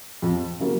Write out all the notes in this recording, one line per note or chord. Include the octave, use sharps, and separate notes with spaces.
F2
C#3 F#3 A#3